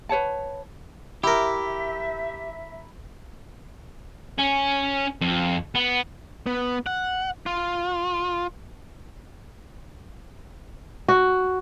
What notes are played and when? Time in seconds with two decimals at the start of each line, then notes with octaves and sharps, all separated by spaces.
0.09 B4 C#5 F#5 A5
1.24 E4 G4 A#4 E5
4.38 C#4
5.21 F2
5.75 B3
6.46 B3
6.86 F#5
7.46 F4
11.08 F#4